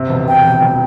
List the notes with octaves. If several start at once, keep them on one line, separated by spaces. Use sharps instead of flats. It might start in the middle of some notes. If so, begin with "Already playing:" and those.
Already playing: C3
E1
E1 G5
E1
E1